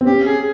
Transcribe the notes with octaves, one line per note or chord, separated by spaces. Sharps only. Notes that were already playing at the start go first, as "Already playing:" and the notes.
C4
C#4 G4
G#4